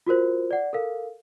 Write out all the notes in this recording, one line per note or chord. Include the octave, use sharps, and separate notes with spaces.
F4 F#4 A#4 C5
D5 F#5
A4 A#4 F5